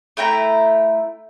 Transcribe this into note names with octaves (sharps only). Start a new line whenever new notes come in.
A3 E4 G5 A#5